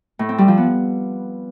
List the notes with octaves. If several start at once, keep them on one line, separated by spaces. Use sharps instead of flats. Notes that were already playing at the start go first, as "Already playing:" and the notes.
A2
C4
G3
F3
B3